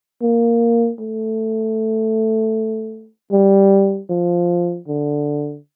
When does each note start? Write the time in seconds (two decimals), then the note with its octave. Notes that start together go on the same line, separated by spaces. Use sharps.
0.22 A#3
1.00 A3
3.32 G3
4.10 F3
4.88 D3